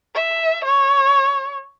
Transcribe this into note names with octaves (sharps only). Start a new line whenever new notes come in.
E5
C#5